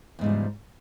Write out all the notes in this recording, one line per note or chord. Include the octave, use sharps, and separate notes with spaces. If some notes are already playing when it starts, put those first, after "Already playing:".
E2 G#2 C#3 F3 G3